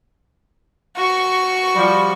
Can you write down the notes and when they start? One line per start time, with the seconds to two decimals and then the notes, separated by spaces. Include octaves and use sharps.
0.96 F#4 C#6
1.76 F3 G3